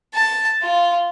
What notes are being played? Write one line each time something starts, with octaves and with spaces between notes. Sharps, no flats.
A5
F4